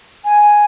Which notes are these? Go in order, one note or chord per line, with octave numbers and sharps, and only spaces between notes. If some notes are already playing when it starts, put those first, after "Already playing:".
G#5